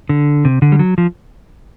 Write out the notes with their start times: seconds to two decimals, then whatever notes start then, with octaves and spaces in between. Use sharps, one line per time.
0.09 D3
0.45 C3
0.62 D3
0.72 G3
0.79 F#3
0.98 F3